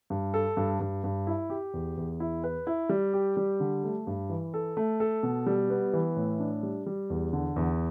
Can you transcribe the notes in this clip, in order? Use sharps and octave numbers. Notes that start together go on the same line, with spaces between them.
G2
A4
G2
G2
G2
E4
G4
E2
E2
E4
B4
E4
G3
G4
G3
D3
A3
G2
E3
A4
A3
A4
B2
G3
B3
E3
A2
D4
G3
G3
E2
D3
E2